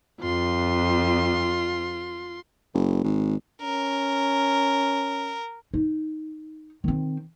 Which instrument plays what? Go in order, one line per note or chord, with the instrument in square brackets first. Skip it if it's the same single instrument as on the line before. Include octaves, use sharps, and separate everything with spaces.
[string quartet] F2 [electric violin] F4 C6
[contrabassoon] F#1
G#1
[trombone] C#4 [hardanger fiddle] A#4
[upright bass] D#4
D#3 C4